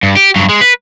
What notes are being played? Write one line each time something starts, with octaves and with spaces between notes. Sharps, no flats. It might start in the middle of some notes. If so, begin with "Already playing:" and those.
G2
G4
G2 F#3
G#3
B4